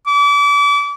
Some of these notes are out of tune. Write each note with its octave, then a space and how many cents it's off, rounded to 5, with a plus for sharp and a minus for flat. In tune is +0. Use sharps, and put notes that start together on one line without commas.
D6 -35